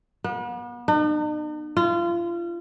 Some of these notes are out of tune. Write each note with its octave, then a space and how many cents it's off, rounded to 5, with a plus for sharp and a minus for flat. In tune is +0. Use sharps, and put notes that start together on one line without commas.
B3 -40
D#4 -45
F4 -30